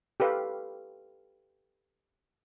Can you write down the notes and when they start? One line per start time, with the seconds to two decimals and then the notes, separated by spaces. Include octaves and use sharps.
0.20 G4 A4 B4 F5